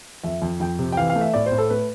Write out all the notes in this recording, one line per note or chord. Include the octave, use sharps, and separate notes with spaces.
F2 E5
F2
F2 G5
C3
G5
E3 F5
F5
A3
E5
A2 D5
C5
A2
A4
A3 B4